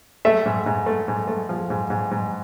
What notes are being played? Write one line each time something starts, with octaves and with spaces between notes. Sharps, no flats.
A3 E5
G#2
G#2
A3
G#2
A3
F3
G#2
G#2
G#2